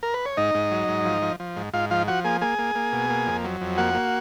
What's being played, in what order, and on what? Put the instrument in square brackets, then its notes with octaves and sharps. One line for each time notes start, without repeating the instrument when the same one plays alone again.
[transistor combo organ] A#4
B4
C#5
G#2 D#4 D#5
G#2
F#3
G#2
F3
F3
F3
G#2
G#2 F4 F5
F3 F4 F5
F3 F#4 F#5
A#3 G#4 G#5
A#3 G#4 G#5
A#3
A#3
B2
A#3
F2
F#3
F2
A#3 F#4 F#5
A#3